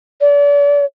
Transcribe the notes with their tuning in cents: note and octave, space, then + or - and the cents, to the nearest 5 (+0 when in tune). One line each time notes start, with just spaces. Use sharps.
D5 -35